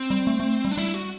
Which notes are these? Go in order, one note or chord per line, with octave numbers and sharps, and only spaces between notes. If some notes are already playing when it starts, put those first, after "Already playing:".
Already playing: C4
G3
A3
A3
G3
D4
G3 E4
F#4